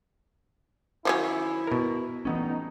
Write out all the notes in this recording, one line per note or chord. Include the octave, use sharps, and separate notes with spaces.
D#3 F3 F#3 C#4 E4
B2 A#4
E3 G3 A3 B3 C#4 D#4